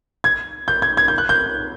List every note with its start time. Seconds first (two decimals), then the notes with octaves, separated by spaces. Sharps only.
0.24 G#6
0.68 G6
0.82 G#6
0.97 G#6
1.08 G6
1.18 F#6
1.29 G6